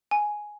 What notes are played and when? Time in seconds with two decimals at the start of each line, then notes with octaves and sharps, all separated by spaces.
0.11 G#5